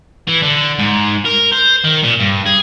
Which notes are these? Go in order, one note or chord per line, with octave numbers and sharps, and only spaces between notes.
E3
D3
G#2
A#4
C5
D#3
A#2
G2
G#4